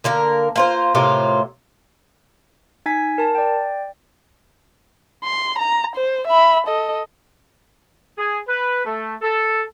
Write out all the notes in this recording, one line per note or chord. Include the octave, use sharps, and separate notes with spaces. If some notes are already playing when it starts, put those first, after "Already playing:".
D3 A#3 A#4
A#3 F4 C5
A2 C3 A#3 F4
D#4 G#5 G#6 B6
A#4 A5
D5 G5
C6
A#5
C5
E5 B5
A4 D#5
G#4
B4
A3
A4